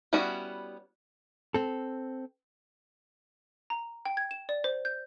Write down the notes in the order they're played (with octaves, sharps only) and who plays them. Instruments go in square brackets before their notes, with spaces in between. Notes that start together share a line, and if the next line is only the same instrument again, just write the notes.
[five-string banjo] G3 B3 C#4 E4 F#4
[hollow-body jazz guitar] C4 A4
[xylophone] A#5
G5
G#6
E7
D5
C5
G6